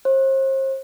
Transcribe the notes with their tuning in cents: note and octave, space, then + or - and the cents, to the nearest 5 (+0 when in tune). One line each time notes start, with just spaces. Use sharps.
C5 +40